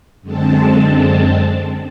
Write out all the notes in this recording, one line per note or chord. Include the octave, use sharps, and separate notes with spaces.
F#2 D3 G#3 C4 A5